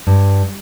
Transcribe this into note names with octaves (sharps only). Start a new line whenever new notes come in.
G2